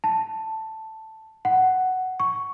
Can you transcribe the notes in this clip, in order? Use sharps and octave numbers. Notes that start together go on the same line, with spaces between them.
A5
F#5
C#6